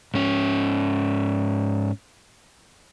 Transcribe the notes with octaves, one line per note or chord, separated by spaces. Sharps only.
G#2 C#4